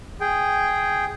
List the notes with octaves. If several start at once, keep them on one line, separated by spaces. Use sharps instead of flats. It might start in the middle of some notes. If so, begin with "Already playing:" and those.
G#4 G5